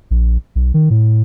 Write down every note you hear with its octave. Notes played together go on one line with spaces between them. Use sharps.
A#1
B1
D#3
A2